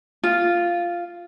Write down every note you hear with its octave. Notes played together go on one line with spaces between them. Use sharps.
F4